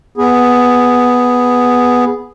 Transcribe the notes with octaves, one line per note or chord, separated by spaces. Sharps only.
B3 G#4